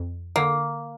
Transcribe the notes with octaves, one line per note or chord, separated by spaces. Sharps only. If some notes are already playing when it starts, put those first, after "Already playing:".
Already playing: F2
D3 A#3